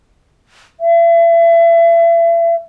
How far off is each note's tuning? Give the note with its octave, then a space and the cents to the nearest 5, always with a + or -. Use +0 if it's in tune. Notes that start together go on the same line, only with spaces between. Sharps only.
E5 +35